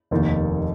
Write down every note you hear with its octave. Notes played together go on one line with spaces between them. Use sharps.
F1 D#2 D#3 A#3 D#4